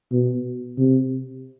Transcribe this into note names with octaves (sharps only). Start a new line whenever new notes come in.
B2
C3